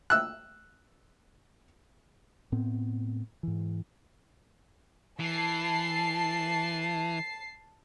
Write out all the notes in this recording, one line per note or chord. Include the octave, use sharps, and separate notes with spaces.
E6 F#6
A2 B3 C4
G#2 E3
E3 A5 C7